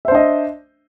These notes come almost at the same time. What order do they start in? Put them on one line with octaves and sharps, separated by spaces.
E5 C5 D4 D#5